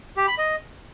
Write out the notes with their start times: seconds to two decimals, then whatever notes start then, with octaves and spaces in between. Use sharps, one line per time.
0.17 G4
0.27 B5
0.38 D#5